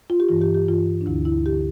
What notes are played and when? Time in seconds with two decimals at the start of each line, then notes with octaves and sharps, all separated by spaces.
0.10 F4
0.20 G4
0.29 G2 E3 F4
0.42 G4
0.55 G4
0.68 G2 E3 F4
1.01 D4
1.06 D2 D3 E4
1.25 E4
1.45 D3 G4